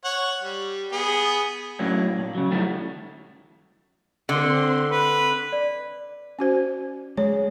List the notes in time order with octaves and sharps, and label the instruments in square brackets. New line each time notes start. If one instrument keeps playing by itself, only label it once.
[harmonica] C#5 F#5
G3
B3 G#4
[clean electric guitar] A2 F#3 A#3 C#4 D4
A#2
C#3 F#3
F#2 D#3 F3 G3 A3 E4
[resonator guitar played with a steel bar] D3 [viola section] C4 C6
[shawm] B4
[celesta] D5
[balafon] C#4 F#4 C5
[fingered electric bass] G#3 [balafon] C#5